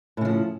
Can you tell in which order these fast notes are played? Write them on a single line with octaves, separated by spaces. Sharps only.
A2 C#3 F3